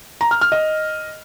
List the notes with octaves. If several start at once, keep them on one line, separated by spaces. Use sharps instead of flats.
A#5
F6
F6
D#5